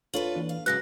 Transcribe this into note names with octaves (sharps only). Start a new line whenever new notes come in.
D#2 D4 F4 A4 B4 C#5 F#7
E3 A#3 D4
F5
G#2 C#3 F#3 F#4 B4 F#6 A#6